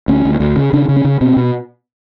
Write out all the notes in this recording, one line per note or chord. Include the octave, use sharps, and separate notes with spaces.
D2 C#4
D2
D2
C#3
C#3 D4
C#3
C#4
C#3
B2 C4
B2